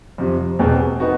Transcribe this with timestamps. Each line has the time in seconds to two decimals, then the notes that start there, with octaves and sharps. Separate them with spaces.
0.18 F2 C3 F3
0.59 E2 B2 G#3 C4
1.00 B3 D#4 F#4